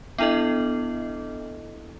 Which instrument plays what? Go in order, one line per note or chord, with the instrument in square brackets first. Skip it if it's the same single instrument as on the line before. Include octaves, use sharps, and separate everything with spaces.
[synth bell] B3 D4 E4 A4 D#5